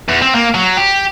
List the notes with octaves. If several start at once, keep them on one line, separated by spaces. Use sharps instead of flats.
E2
C4
A#3
F#3
G4